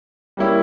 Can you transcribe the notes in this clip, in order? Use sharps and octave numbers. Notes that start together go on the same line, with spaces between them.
G3 A#3 C#4 E4 G4